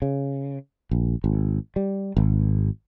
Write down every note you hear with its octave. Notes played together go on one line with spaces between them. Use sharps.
C#3
A#1
G#1
G3
G#1